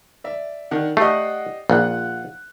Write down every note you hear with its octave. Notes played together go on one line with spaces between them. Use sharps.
D5 E5
D#3 D4 F#5
A3 G4 D5 D#5 F#5 C7
A#1 F4 F#5 F#6